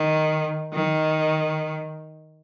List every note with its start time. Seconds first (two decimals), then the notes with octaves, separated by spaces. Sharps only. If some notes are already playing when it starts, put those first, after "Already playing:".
Already playing: D#3
0.73 D#3